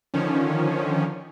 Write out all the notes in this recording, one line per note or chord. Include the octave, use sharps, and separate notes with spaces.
D3 D#3 F3 C#4